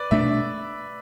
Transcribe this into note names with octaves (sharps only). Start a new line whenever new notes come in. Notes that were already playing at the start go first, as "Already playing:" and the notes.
Already playing: B4 D5
B2 A3 D4 E5